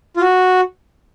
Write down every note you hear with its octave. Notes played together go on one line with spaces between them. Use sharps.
F4
F#4